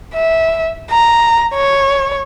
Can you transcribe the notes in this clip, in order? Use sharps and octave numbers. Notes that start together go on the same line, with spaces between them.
E5
A#5
C#5